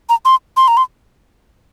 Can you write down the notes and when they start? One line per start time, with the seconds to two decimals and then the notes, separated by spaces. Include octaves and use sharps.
0.09 A#5
0.25 C6
0.57 C6
0.68 A#5
0.77 C6